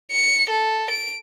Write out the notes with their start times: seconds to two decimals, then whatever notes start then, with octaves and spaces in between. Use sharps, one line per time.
0.11 C#7
0.50 A4
0.90 D7